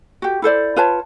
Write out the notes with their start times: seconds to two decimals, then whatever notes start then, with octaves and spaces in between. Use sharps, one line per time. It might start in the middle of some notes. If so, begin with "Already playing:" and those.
0.22 F#4 G4
0.42 E4 A4 C5 D5
0.76 F4 B4 C#5 A5